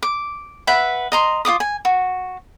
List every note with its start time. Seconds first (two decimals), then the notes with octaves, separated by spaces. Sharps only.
0.03 D6
0.67 B4 E5 F#5
1.12 D#5 A#5 C6
1.45 F4 D#5 D6 D#6
1.60 G#5
1.85 F#4